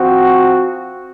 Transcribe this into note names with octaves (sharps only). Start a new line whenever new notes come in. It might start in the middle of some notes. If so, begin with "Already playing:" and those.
Already playing: F3 C4 F#4